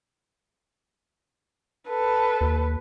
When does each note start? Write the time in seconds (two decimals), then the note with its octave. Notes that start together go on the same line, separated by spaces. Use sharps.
1.88 A4 B4
2.41 D#2